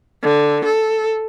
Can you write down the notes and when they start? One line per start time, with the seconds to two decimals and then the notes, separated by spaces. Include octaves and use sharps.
0.22 D3
0.65 A4